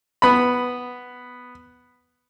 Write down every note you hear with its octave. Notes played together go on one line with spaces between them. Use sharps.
B3 B5